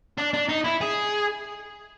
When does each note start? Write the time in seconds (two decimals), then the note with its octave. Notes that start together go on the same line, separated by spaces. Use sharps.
0.18 D4
0.34 D4
0.49 D#4
0.64 E4
0.81 G#4